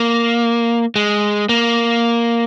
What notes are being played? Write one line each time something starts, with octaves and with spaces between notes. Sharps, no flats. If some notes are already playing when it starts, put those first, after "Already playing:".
Already playing: A#3
G#3
A#3